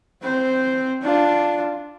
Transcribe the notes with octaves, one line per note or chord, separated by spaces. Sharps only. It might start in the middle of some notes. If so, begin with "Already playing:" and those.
C4 C5
D4 F4